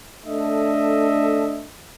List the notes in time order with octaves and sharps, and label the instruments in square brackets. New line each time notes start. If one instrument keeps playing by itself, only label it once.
[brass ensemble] A3 D4 A4 D#5 E5